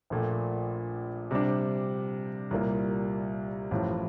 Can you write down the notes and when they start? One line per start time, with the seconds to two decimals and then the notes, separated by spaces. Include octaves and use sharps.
0.10 A#1 A#2 A3
1.31 C3 G3 D4
2.51 C2 A#2 G3 A#3
3.71 A1 A2 F3